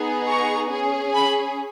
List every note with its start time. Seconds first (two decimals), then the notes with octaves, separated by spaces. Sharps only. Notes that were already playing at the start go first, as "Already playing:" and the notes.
Already playing: B3 D#4 G#4
0.27 A#5 C#6
0.70 C#4 G#4
1.13 G#5 B5